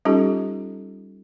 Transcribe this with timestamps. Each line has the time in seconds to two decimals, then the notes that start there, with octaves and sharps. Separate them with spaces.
0.05 G3 C#4 D#4 F4 G4 A4